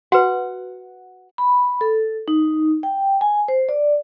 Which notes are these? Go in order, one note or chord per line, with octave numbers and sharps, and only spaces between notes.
F#4 B4 F#5
B5
A4
D#4
G5
G#5
C5
D5